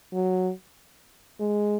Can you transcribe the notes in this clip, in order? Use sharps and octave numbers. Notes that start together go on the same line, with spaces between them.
F#3
G#3